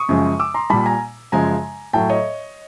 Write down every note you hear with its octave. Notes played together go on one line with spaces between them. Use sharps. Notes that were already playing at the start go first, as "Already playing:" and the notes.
Already playing: C#6 D#6
F#2 C#3 F3 G#3
D6 E6
A#5 C6
A#2 G3 A5 B5
G#5 A#5
F#2 C#3 F3 G#3 G#5 A#5
A2 F#3 G5 A5
C#5 D#5